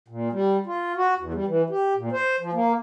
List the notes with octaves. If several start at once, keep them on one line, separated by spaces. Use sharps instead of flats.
A#2
G3
F4
F#4
E2
G3
E3
G4
A#2
C5
F3
A#3